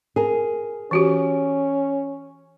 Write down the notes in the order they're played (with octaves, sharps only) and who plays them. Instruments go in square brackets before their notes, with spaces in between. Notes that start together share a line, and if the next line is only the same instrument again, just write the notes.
[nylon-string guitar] G#4 A#4
[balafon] E3 F#4 G4 [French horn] C#4